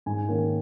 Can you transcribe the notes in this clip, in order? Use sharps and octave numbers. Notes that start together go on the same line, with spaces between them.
G#2 G#5
D#3 A#3 C#4